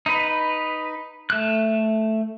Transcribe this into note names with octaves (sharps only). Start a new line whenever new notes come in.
D#4 B4
A3 F#6